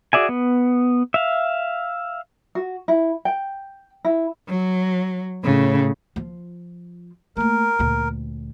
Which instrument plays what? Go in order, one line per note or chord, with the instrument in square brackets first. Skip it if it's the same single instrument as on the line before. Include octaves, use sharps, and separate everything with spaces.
[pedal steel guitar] F#4 G#4 D5 E5 G#5
B3
E5 F5
[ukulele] F#4
E4
G5
E4
[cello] F#3
A2 C#3
[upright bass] F3 F4
[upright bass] A3 A#3 [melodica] A#4
[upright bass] D2 A#2